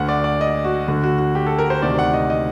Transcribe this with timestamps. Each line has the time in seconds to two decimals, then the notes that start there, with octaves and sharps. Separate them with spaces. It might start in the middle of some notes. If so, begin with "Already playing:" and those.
Already playing: D2 D3 F#5
0.09 D5
0.24 D5
0.41 D#5
0.65 F#4
0.88 D2 D3 F#4
1.03 F#4
1.19 F#4
1.35 G4
1.46 A4
1.59 A#4
1.70 C5
1.82 D2 C3 D#3 D5
1.99 F#5
2.14 D#5
2.30 D#5